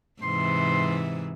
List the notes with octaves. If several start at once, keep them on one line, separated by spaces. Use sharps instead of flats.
G#2 C3 E3 C6